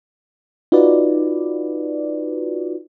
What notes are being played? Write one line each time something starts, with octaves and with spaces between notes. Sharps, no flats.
D#4 F4 F#4 B4 D5